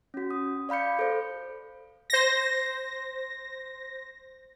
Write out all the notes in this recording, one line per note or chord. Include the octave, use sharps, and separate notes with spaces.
C#4 F#4
D#6
D5 F5 B5 G6 C#7
A4 C5
C5 A#6